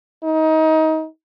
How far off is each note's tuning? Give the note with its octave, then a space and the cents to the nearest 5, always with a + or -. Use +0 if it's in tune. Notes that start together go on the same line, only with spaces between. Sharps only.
D#4 +25